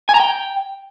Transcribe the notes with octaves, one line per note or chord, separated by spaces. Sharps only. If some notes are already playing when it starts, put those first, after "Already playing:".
G#5
A#5
G5